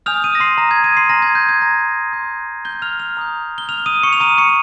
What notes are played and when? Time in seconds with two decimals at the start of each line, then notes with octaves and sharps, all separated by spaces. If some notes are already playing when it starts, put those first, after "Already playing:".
0.06 G#5 D#6 F6 G6 F7
0.24 D#6 D#7
0.35 A#6
0.40 C6 C7
0.58 A#5 A#6
0.71 G#6
0.84 D#6 D#7
0.97 C6 C7
1.09 G#5 A#5 C6 F6 A#6
1.22 G#6
1.35 G6
1.49 G#6
1.61 A#5 A#6
2.13 C6 D#6 G6
2.65 G6 G7
2.82 F6 F7
2.99 F6 F7
3.17 A#5 D#6 G6
3.58 G7
3.69 F6 F7
3.86 D#6 D#7
4.03 C#6 C#7
4.13 F7
4.20 A#5 D#6 F6 D#7
4.38 C#6 C#7